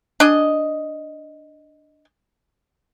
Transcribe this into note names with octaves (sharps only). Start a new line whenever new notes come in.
D4 G#4 D#5